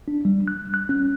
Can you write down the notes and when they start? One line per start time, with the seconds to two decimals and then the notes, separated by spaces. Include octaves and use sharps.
0.08 D4
0.25 G3
0.48 F#6
0.74 F#6
0.89 C#4